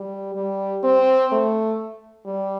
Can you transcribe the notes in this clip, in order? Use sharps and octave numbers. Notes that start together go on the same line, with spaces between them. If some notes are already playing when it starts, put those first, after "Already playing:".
Already playing: G3
G3
C4
A3
G3